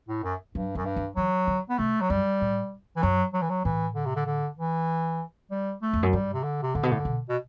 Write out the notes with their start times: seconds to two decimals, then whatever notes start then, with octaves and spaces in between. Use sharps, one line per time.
0.08 A2
0.23 F#2
0.54 G2 F#3
0.75 F#2 F#3
0.85 G2
0.96 E3
1.16 E3 F#3
1.47 D3
1.70 B3
1.78 C3 A3
2.01 F#3
2.10 F#2 G3
2.41 A2
2.96 E3
3.02 F#2 F#3
3.34 F#3
3.42 E3
3.49 F#3
3.65 A2 E3
3.95 D3
4.06 C3
4.16 D3
4.26 D3
4.57 E3
5.51 G3
5.82 A3
5.93 E2
6.03 F#2
6.13 G2 G3
6.33 C3
6.43 D3
6.63 C3
6.75 A2 D3
6.83 B2
6.91 A2
7.05 B2
7.29 B2